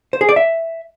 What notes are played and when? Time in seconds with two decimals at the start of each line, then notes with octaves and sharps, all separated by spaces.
0.13 C5
0.21 G#4
0.29 D5
0.36 E5